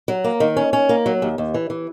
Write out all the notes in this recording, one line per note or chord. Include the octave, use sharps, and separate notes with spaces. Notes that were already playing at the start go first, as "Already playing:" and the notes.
F#3
A#3
D#3
C#4
C#4
A#3
F#3
D#2
D#2
E3
E3